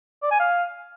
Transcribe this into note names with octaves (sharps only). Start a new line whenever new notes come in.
D5
G#5
F5